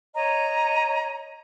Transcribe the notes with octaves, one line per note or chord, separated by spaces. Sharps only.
C#5 D#5 A#5